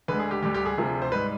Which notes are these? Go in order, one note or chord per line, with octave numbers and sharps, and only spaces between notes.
D2 D3 G#3 B4
G#4
G4
D2 D3 G3 G4
G4
G#4
D2 C3 F3
C5
G#2 G3 B4